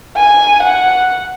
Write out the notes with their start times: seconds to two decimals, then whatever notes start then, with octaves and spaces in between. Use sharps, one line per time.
0.16 G#5
0.63 F#5